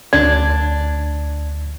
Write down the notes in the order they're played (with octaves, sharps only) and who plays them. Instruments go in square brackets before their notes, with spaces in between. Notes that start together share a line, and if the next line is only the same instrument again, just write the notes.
[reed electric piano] D2 G#6 [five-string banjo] D4